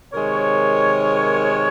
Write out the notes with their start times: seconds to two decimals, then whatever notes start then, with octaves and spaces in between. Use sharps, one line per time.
0.12 C3 D#3 G#3 A#4 C#5